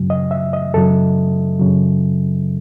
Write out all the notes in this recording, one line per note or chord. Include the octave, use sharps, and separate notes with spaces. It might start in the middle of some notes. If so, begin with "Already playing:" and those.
Already playing: F#2 C#3 F#3
D#5
E5
D#5
F#2 C#3 F#3 A4
F#2 C#3 F#3